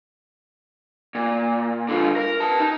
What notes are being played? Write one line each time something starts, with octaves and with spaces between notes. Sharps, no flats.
A#2
D3 F4
A#4
B4 A5
D#4